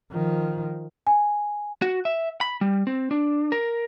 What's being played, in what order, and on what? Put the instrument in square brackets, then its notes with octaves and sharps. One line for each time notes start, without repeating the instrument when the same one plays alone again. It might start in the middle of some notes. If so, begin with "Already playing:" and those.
[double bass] D#3 F3
[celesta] G#5
[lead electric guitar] F#4
E5
B5
G3
C4
D4
A#4